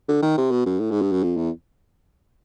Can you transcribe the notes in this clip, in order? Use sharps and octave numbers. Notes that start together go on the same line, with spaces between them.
D3
D#3
C3
B2
F#2
A2
G#2
G2
F#2
F2
E2